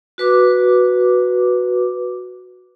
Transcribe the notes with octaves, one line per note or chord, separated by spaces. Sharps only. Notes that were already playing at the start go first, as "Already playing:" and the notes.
F#4 B4 D6